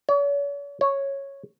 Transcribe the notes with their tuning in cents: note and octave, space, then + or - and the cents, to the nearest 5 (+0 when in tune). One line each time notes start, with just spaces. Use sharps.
C#5 +45
C#5 -5